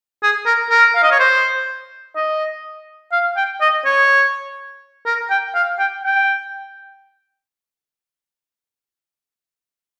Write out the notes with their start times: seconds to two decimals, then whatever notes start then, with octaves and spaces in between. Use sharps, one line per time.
0.23 G#4
0.46 A#4
0.70 A#4
0.95 F5
1.03 D#5
1.11 C#5
1.19 C5
2.16 D#5
3.12 F5
3.36 G5
3.61 D#5
3.85 C#5
5.06 A#4
5.30 G5
5.54 F5
5.79 G5
6.03 G5